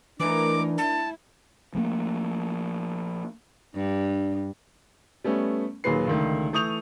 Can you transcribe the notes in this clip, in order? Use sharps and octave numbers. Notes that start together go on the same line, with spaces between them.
E3 A3 D4 D#4 A#4 D6
E4 A5
F3 A3 A#3
G2 D4
G3 A3 B3 C#4
D#2 A#2 F#3 G#4 B4 C7
C#2 D3 D#3 A3
E3 A3 C#6 D#6 G6 F7